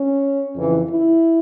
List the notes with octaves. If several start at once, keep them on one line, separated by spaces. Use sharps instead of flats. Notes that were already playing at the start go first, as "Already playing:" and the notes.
Already playing: C#4
F2 C#3 E3
E4